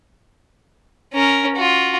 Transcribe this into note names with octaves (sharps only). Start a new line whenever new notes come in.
C#4 A#4
F4 F#4